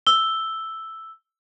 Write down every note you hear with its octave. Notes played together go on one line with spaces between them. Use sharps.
E6 G7